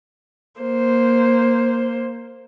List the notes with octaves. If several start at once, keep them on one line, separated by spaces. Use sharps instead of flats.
A#3 C5